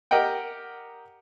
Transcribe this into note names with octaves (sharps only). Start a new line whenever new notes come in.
G4 A#4 D#5 F#5 G5